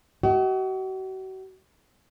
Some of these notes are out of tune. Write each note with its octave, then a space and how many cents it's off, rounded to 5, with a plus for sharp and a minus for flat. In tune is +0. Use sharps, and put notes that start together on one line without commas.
F#4 +40 D#5 +35